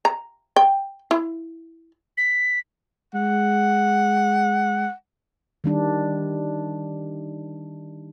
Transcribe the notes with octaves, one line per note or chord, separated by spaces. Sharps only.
A#5
G5
E4
B6
G#3 F#5
D#3 G3 D4